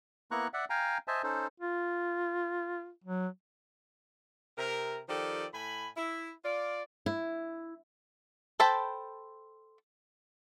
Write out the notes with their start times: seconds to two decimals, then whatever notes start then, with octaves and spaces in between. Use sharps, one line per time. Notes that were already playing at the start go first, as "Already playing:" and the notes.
0.31 A#3 B3 E4 A#5 C#6 F#6
0.53 D5 E5 F#5
0.70 F5 G5 G#5 A#5
1.08 C5 D#5 E5 G#5 A5
1.23 C#4 D#4 A4 C5
1.60 F4
3.04 F#3
4.58 C3 A#4
5.08 D#3 F3 G4 A4 D5
5.54 A2 G#5 B5
5.97 E4
6.45 F4 D5
7.06 E4
8.60 A4 C5 G5 A5 B5